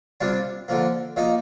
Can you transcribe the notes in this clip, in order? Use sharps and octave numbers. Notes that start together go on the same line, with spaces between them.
C3 G3 D4 F4
D3 F3 A#3
F3 A#3 D#4